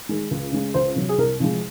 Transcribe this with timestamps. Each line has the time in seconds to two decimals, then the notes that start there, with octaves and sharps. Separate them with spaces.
0.09 D#3 G#3
0.31 C#2
0.52 C#3 G#3
0.74 C#2 C5
0.96 C3 F#3
1.09 G#4
1.18 C2 A#4
1.40 C3 F3 G#3